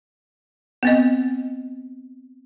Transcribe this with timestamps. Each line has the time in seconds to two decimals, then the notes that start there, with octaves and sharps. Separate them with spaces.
0.83 B3 C4 D#5